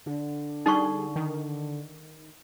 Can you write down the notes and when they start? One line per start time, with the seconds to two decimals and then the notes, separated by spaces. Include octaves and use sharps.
0.06 D3
0.66 G3 D4 D#4 G#4 C#6
1.16 D#3